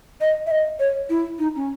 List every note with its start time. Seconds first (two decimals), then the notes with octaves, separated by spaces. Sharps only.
0.21 D#5
0.46 E5
0.51 D#5
0.80 C#5
1.10 E4
1.39 D#4
1.56 C#4